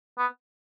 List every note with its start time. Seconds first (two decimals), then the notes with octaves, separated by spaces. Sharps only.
0.18 B3